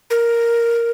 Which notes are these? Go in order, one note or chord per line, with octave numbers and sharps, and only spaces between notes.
A#4